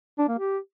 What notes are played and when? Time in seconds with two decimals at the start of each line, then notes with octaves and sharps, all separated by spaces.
0.19 D4
0.28 A#3
0.38 G4